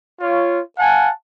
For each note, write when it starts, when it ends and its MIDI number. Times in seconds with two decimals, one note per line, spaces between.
0.20 0.59 65
0.20 0.59 73
0.79 1.10 77
0.79 1.10 78
0.79 1.10 80
0.79 1.10 81